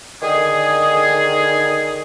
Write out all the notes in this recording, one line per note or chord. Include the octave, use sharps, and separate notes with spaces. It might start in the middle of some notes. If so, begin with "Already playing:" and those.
D3 D#3 G#4